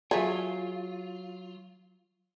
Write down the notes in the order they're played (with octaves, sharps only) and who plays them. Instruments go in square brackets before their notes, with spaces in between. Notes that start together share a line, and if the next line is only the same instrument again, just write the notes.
[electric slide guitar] F#3 F4 [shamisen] A3 G#4